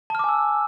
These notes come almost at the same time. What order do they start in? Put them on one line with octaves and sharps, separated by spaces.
A5 F6 D6 G#5 E6